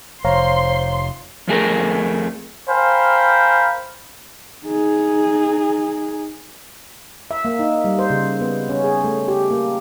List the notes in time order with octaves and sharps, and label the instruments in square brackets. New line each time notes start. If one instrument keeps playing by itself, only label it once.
[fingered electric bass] F1 [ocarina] C5 [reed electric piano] C#5 F5 A#5 [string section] C6
[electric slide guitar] F2 A3 G#4 A#4
[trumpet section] A#4 C5 F5 G5 G#5 B5
[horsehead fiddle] D#4 G#4
[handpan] E5
A#3
D#4
G3
C5
C#3
B3
C#4
G#4
A3
G4
A#3